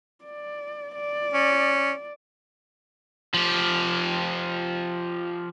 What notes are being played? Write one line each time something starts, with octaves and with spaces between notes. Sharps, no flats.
D5
D5
C#4
F3 G4